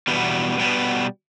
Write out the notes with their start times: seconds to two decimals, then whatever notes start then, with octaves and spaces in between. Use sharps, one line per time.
0.08 E2 B2 G3 B3
0.59 B2 G3 B3